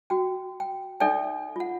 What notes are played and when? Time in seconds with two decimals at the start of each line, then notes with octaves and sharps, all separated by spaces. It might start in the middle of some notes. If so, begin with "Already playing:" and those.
0.10 F#4 G5
0.60 G5
1.00 D#4 A4 D5 E5 G5
1.56 F4 F#5